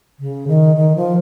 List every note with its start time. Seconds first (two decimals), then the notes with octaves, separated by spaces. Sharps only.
0.19 C#3
0.47 D#3
0.76 D#3
0.96 F3